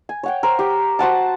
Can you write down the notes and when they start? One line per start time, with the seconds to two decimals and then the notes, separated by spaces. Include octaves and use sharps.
0.09 G#5
0.23 C#5 F#5 G5
0.43 A#4 C5
0.59 G4 G5
0.99 F#4 C5 F#5 A5